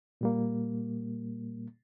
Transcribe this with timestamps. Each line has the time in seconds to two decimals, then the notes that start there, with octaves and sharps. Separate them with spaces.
0.21 A#2 G3 A#3